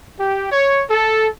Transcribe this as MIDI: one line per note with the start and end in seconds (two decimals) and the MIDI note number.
0.19 0.50 67
0.51 0.83 73
0.89 1.27 69